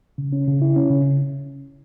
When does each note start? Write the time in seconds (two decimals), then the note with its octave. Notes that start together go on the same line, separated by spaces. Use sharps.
0.18 C#3
0.33 C#4
0.47 C#3
0.62 E4
0.76 C#4
0.90 C#3